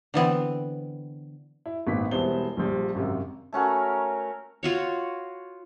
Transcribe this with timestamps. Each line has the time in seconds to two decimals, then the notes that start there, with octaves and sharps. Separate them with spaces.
0.14 D3 E3 B3 C4
1.66 E4
1.87 G#1 A#2 B3 D#4 B6
2.11 E1 G3 B3 E4 C5 G7
2.57 A#1 F3 G3
2.95 G#1 F#2 C3
3.53 A3 C#4 F#4 A#4
4.63 F4 F#4 C#5